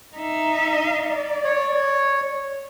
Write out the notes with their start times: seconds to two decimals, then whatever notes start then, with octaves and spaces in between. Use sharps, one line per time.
0.16 D#4 E5
1.05 D5
1.44 C#5